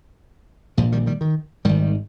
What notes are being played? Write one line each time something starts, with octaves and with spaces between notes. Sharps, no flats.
A#1 A#2 F3 G#3
D#3 G3
D#3 G3
D#3
G#1 G#2 D#3 G3